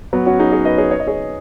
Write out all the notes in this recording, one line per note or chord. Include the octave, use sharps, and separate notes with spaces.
F#3 B3
C#4 F#4
D#4 G#4
G#4 C#5
B4 D#5
G#4 C#5
C#5
D#5
G#4 C#5